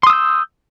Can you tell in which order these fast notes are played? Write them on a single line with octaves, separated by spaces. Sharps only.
C6 D#6 E6 G6